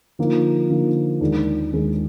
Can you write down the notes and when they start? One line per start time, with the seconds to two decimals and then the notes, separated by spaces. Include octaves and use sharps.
0.19 D3 F3 A#3 D#4
0.70 D3 F3 A#3 D#4
1.21 D#2 D#3 G#3 D4 G#4
1.72 D#2 D#3 G#3 D4 G#4